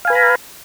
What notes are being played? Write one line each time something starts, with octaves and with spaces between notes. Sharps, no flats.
B4 F5 G#5 A#5 B5